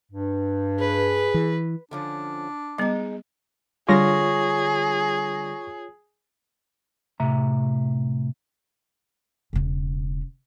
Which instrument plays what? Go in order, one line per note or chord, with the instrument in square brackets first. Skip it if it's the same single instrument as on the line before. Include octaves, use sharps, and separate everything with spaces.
[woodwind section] G2
[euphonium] G#4 [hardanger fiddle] B4
[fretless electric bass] E3
[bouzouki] D3 F3 C#4 [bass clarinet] D4
[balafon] G3 B3 [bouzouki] G#3 D#4
[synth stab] D3 G3 A#6 [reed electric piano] F4 C#5 [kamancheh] G#4 [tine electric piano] C#6
[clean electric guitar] A2 C3 E5 A#5
[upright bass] E1 C#3